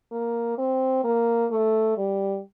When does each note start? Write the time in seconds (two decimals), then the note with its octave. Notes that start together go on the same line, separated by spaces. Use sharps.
0.12 A#3
0.58 C4
1.04 A#3
1.51 A3
1.98 G3